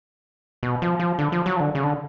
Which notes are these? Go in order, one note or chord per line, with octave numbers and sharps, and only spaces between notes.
B2
F3
F3
D3
F3
F#3
F3
D3
C#3
D3